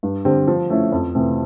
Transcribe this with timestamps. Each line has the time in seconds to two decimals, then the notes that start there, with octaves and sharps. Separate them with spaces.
0.03 G2
0.25 D3 G3 C4
0.47 F3
0.70 A3 C#4 E4
0.92 F2
1.15 C3 E3 A3 C4